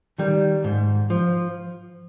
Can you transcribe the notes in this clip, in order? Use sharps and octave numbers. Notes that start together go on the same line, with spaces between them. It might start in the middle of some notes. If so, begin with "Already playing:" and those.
D#3 G3
G#2
F3